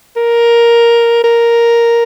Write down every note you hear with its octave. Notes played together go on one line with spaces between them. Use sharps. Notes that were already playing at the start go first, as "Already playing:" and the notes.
A#4
A#4